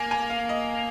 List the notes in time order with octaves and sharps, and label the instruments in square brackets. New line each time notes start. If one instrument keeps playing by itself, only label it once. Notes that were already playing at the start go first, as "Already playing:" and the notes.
Already playing: [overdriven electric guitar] A#3 [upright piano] G#5
[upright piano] G#5
F5
D#5